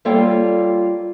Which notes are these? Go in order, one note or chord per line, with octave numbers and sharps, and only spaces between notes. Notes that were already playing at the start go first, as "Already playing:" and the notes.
G3 A#3 F4 A4 C#5 G5